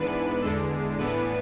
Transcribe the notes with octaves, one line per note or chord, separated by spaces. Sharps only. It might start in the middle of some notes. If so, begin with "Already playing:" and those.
Already playing: G#2 E3 B3 D4 B4
E2 D3 G#3 D4 A4
A2 E3 B3 D4 B4